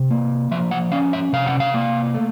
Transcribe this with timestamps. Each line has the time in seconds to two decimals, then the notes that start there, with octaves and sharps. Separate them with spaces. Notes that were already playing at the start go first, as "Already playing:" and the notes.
Already playing: C3
0.11 A#3
0.51 F3 E5
0.71 F#5
0.92 C#4 F5
1.13 E5
1.33 C3 F5
1.47 F#5
1.60 F5
1.74 A#3
2.14 A3